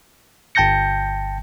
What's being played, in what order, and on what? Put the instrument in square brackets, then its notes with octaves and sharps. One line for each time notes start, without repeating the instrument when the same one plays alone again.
[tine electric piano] G1 G5 A5 G6 A#6 C#7